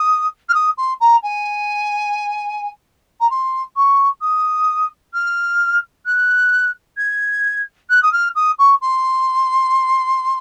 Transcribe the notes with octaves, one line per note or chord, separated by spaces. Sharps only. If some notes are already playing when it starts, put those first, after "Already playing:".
Already playing: D#6
F6
D#6
C6
A#5
G#5
A#5
C6
C#6
D#6
F6
F#6
G#6
F#6
D#6
F6
D#6
C#6
C6